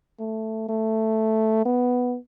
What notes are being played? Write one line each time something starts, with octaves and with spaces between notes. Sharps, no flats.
A3
A3
B3